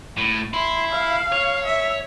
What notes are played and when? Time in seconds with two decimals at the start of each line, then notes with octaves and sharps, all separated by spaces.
0.17 A2
0.53 E4 C6
0.91 F5
1.33 C#5
1.65 E5